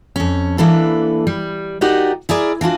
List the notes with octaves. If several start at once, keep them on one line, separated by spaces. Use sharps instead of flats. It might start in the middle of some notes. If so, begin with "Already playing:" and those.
F2 C#4
E3 A#3 D4 A4 B4
G3
D#4 F#4 G4 A#4 D5 D#5
E4 G#4 A#4 D5
E3 D4 F4 F#4